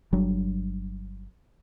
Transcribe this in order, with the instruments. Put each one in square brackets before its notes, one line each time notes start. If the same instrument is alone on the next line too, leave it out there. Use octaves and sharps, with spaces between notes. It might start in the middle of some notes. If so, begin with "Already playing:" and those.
[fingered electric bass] G1 F#3 G3 D4